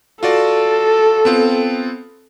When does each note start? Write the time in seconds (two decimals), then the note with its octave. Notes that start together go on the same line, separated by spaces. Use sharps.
0.23 F4 F#4 A4 D5
1.25 B3 C4 F4